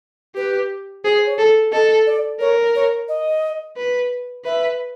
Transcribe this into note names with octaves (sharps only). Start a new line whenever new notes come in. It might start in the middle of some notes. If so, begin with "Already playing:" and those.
G4 B4
G#4 C5
C5
C#5
A4
A4 D#5
D5
A#4 C#5
C#5
D#5
B4
B4 E5